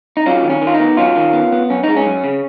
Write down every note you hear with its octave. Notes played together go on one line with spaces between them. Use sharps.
D#4
F#3 C#4 F4
D#3
C#4
D#3
F4
D#4
B3
F#3 C#4 F4
D#3
B3
B3
F#2 C#4
G#3 D#4
C#4
F#2
C#3